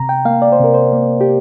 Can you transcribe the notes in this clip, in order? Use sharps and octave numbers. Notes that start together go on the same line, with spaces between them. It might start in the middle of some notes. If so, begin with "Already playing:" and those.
Already playing: C3 A#5
G5
A#3 F5
D5
C5
C3 A#4
C5
A#3
G4